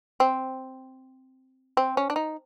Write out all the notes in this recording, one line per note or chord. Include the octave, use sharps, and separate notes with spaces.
C4
C4
C#4
D4
D#4